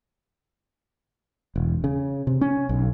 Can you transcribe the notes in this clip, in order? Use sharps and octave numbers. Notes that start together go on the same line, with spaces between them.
E1
C#3
C3
C#4
B1